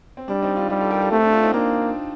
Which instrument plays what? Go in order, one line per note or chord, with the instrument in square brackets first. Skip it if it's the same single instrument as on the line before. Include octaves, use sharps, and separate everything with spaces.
[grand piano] C4
[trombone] G3 [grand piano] D4
[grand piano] C4 D#4
D4 F4
[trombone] G3 [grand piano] D#4 G4
[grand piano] F4 A4
G4 A#4
F4 A4
[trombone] A3 [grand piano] C4
[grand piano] D4
D4 F4
C4 D#4
[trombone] A#3 [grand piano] D4